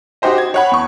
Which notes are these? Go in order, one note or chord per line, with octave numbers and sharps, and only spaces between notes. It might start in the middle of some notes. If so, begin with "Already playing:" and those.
D#4 F#4 G4 C5 D#5
G#6
C#5 F#5 B5
E2 C#6